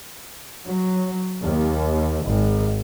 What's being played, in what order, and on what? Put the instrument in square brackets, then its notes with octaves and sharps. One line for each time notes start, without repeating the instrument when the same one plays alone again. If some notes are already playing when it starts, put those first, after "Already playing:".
[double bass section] F#3
D#2
G#1